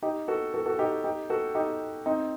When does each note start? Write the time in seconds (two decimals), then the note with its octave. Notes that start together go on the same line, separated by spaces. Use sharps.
0.02 D#4 G4
0.28 F#4 A4
0.54 F#4 A4
0.66 F#4 A4
0.79 D#4 G4
1.04 D#4 G4
1.30 F#4 A4
1.55 D#4 G4
2.06 C4 D#4